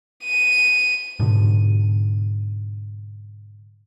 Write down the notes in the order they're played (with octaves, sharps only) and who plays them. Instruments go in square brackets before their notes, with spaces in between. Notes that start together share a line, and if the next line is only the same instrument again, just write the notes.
[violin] D#7
[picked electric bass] G#2 B2 D3